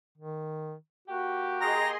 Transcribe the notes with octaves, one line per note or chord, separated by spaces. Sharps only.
D#3
A#3 F#4 G4
G#4 D#5 A#5 C6